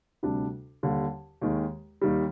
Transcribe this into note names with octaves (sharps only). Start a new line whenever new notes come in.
D2 C3 G3 D4
D#2 D3 G3
D#2 D#3 G#3
D#2 D#3 G3